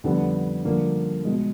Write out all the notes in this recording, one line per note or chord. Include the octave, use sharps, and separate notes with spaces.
F2 D3 G3 B3
G2 D3 F3 A#3
B2 G#3